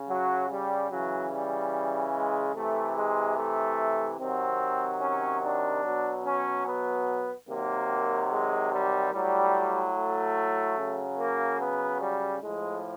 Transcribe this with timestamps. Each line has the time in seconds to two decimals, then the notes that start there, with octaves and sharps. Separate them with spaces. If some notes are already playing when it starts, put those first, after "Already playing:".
Already playing: C#3
0.10 F#3
0.50 G3
0.91 C#3 E3 F#3
1.32 G3
2.15 G#3
2.56 C3 E3 A3
2.97 G#3
3.38 A3
4.20 C3 D#3 F#3 C4
5.02 C#4
5.44 D4
5.85 B2 F#3
6.26 C#4
6.66 B3
7.49 C3 D#3 F#3 A#3
8.32 G#3
8.73 G3
9.13 A2 F#3 G3
9.96 A3
10.78 C#3 F#3
11.19 A#3
11.61 B3
12.01 G3
12.42 A2 F3 G#3